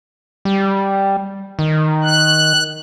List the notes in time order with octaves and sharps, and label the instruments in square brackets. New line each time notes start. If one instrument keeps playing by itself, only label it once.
[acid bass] G3
D#3
[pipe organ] F#6